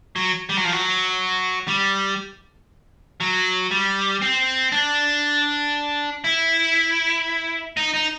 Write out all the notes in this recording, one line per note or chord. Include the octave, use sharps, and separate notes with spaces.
F#3
G3
F#3
F3
F#3
G3
F#3
G3
C4
D4
E4
D#4
D#4